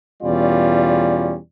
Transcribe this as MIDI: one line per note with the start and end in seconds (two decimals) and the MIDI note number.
0.23 1.37 40
0.23 1.37 47
0.23 1.37 55
0.23 1.37 61
0.23 1.37 65
0.23 1.37 74